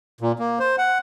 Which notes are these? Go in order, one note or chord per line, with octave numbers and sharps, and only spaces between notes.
A#2
A#3
C5
F#5